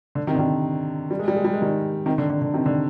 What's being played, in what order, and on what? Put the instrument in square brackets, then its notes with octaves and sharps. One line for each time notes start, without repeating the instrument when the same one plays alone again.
[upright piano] D3
C3 D#3
D3
C3 D#3
G3
G#3
G3
G#3
G3
G#3
D#3 G3
C3 D#3
D3
D3
D3
C3 D#3
D3